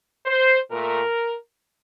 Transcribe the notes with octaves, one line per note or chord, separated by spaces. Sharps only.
C5
A#2 A3 A#4